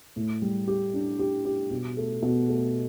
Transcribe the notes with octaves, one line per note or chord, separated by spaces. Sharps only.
A2
G3
G4
D4
G4
G4
B2
A3
B2
A3